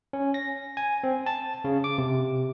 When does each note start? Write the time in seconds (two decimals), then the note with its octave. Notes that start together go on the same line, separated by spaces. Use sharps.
0.13 C#4
0.34 A#6
0.77 G#5
1.04 C4
1.26 A5
1.64 C#3
1.84 D6
1.98 C3